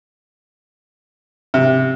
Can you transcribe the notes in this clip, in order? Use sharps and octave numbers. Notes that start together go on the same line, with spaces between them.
C3